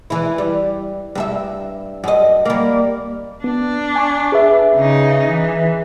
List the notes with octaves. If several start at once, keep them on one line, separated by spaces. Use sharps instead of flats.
E3 E4
G3
G2 A4 E5
F#2 D#5
G3 A#3
B3 D4
G#5 C#6
G#4 B4 E5
C#3 D#4
E3